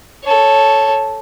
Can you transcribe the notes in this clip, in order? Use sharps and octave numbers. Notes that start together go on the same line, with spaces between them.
A4 C#5